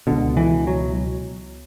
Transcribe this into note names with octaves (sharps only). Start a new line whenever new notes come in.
C#2 B2 D3
E3
F#3